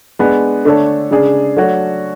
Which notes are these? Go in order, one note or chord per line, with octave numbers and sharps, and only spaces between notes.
G#3 B3 D4
D3 A3 D4 A4 C#5
C#3 G#3 D4 G#4
F#3 A3 D4 F#4 C#5